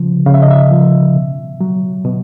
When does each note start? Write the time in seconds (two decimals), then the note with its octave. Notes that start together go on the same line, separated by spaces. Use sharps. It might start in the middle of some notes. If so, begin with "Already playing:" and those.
Already playing: C#3 F3
0.26 C#3 F5
0.34 E5
0.42 D#5
0.50 E5
0.71 F3
1.15 B2
1.61 F#3
2.05 B2